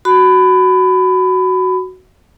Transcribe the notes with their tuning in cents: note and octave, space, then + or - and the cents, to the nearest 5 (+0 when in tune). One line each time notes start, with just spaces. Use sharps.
F#4 +5 B5 +20